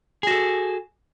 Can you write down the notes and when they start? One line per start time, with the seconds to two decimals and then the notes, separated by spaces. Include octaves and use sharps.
0.23 G#4
0.27 F#4
0.31 A4